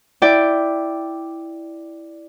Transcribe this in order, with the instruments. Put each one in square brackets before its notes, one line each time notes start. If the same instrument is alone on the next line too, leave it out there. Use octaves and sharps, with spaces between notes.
[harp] E4 D5 G5